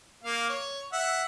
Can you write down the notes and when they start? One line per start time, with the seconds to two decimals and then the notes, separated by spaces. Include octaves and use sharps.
0.24 A#3 F5
0.49 C#5
0.93 E5 F#5